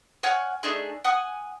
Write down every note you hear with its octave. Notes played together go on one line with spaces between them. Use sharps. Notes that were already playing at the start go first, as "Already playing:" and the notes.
C#5 F#5 G#5 F6
A3 D4 D#4 G#4
F#5 G#5 D#6